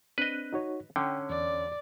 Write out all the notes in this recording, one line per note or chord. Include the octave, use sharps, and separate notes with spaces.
C4 D4 B4 D#5 F#6
D#4 F#4 C#5
D3 C#4 G5
E2 D5